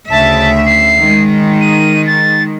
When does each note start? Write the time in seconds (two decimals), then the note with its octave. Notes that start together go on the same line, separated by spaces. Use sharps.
0.10 D2 C#3 E5 A5
0.66 C7
0.99 D#3 G#3
1.61 D#7
2.07 A6